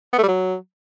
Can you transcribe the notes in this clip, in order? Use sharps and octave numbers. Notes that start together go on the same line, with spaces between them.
B3
A3
G3
F#3